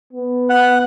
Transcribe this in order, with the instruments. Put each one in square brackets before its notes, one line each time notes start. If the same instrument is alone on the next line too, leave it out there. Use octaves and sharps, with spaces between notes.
[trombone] B3
[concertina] F#5